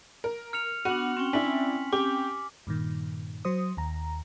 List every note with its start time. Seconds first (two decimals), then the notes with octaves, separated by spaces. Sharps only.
0.24 A#4
0.53 F6 C#7 F7
0.85 B3 D4 F#4 C#7 F#7
1.17 C4 C#4 G5
1.33 D4 E4 G#5 B6 F#7
1.93 G4 D6
2.67 G2 A#2 D#3
3.45 F#3 C5 D#6
3.77 D#2 A#5